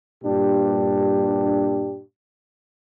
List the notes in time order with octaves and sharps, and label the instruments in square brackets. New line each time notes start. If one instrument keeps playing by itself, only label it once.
[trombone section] G2 A#2 D4 G4